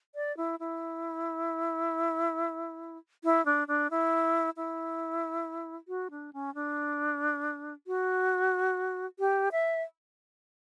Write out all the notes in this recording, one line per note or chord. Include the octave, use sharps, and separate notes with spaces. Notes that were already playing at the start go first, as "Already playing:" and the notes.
D5
E4
E4
E4
D4
D4
E4
E4
F#4
D4
C#4
D4
F#4
G4
E5